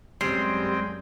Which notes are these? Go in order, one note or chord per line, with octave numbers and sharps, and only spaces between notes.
F#2 G3 G#3 C4 G5 C6